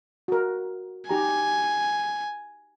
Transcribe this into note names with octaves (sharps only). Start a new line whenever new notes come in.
F#4 A#4
D#4 G4 G#5 A#5